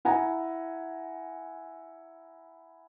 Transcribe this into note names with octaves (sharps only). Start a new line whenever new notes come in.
E4 F#5 G#5 A#5